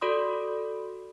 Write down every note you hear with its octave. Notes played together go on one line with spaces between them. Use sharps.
F#4 A4 D5 B5 C6 D#6